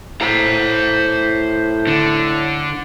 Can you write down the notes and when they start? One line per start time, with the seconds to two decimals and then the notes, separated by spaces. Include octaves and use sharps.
0.22 A2 C5 A#5
1.87 D3